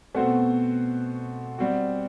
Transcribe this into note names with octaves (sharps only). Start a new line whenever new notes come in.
B2 A3 C4 F#4 C5
G3 C4 F#4